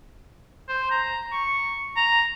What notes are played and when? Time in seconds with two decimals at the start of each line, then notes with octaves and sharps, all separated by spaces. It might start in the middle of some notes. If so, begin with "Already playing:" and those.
0.69 C5
0.91 A#5
1.32 C#6
1.97 A#5